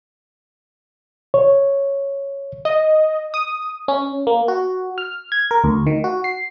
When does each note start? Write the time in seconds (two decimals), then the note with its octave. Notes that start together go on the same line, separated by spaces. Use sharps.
1.34 C#5
2.65 D#5
3.34 D#6
3.88 C#4
4.27 A#3
4.48 F#4
4.98 F6
5.32 G#6
5.51 A#4
5.64 D2
5.87 D#3
6.04 F#4
6.24 C7